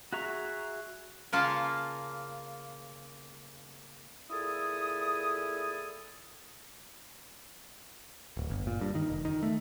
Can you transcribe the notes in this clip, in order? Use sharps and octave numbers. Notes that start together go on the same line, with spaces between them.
F#4 G#4 E5 A#5 C#6
C#3 A#3 F4 A5
A#2 E4 G#4 A4 G#5 D#6
D1
G1
A#2
G2
D#3
F1
D#3
A3